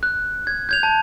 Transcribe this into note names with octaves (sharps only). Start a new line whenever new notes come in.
F#6
G#6
G6 G#6 F7
A5